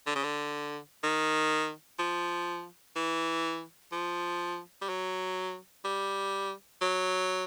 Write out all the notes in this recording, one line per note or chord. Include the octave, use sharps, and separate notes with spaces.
D3
C#3
D3
D#3
F3
E3
F3
G3
F#3
G3
F#3